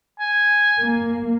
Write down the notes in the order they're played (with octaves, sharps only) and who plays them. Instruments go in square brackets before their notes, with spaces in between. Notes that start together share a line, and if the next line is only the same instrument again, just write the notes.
[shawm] G#5
[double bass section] A#3